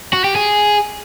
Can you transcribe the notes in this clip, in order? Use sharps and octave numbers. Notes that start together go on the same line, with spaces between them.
F#4
G4
G#4